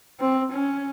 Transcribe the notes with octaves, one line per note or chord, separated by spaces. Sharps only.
C4
C#4